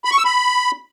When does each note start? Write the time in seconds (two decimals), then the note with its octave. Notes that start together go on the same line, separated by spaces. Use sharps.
0.05 B5
0.11 C#6
0.18 E6
0.25 B5